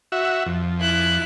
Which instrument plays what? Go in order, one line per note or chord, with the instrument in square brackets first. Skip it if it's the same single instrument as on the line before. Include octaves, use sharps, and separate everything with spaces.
[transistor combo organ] F#4 E5
F2
[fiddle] E4 F#6